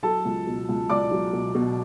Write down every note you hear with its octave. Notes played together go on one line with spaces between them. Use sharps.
F#3 A4 A5
C#2
B2
C#2
C#2 D5 D6
F#3
B2
B2